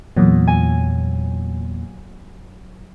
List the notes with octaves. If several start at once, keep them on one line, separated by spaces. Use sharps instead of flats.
E2 A#2 F#3
G#5